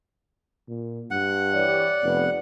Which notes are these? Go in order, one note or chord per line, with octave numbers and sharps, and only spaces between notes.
A#2
G2 F#5
E3 G4 C#5 D5
F1 B3